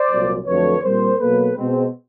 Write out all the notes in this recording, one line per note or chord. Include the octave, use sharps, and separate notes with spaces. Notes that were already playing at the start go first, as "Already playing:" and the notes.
Already playing: C5 D5
C2 A#2 F#3
F2 D3 F#3 A3 B4 C#5
A#2 G3 C4 A#4 C5
B2 F#3 A#3 A4 B4
B2 G#3 C4